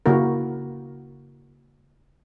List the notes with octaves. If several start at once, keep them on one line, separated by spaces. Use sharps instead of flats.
C#3 A#3 E4 F#4 A#4